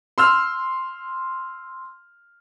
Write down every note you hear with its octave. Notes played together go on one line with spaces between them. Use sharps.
C6 E6 F6